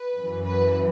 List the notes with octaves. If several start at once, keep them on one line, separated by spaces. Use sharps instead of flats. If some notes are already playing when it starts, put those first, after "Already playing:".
Already playing: B4
F#2 E3
B4